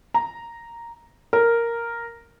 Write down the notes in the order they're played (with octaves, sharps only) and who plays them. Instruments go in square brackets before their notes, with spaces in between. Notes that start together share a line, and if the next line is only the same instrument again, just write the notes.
[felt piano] A#5
A#4